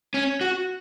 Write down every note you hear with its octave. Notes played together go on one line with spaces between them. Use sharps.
C#4
F#4